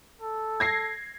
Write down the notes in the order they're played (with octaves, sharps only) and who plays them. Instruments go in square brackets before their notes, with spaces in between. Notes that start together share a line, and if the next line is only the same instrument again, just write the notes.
[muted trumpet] A4
[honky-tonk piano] G#6 A#6 C7